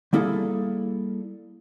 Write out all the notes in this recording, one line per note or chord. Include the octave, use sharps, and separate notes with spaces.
G3 A#3 E4 G#4 A4